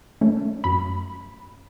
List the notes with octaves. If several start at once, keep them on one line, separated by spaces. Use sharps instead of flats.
A3 C#4
F#2 B5